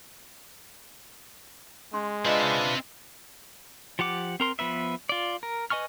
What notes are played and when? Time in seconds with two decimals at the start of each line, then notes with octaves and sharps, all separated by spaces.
1.93 G#3 C#4 C6
2.25 C4 D4 F4 B4 D#5 E5 A5
3.99 F3 G4 F#5 D6
4.40 C4 A#4 C6
4.59 F3 B3 B4 E5
5.09 F4 D5
5.43 A#4
5.70 B4 D#5 G#5 C#6 F6